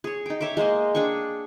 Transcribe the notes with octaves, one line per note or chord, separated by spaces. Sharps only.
G#4 C#5
D#4 G5
C#5 E5 G5 D6
G#3 A#3 C5 D#5
D4 G#4 G5 C#6